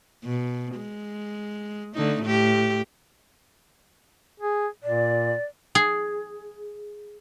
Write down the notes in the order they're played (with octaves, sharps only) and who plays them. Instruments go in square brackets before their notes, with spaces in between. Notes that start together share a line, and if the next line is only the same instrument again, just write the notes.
[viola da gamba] B2
G#3
D3 A3 D#4
A2 G4
[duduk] G#4
[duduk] A#2 [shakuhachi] D5
[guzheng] G#4